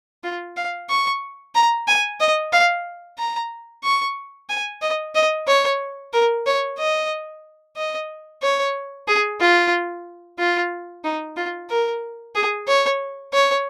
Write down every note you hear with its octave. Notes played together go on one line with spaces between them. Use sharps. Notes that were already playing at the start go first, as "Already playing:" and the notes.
F4
F5
C#6
A#5
G#5
D#5
F5
A#5
C#6
G#5
D#5
D#5
C#5
A#4
C#5
D#5
D#5
C#5
G#4
F4
F4
D#4
F4
A#4
G#4
C#5
C#5